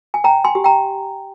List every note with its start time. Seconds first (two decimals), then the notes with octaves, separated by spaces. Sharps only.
0.14 G#5
0.24 C#5 G5 A#5
0.44 G#5 C6
0.55 G4
0.64 G5 A#5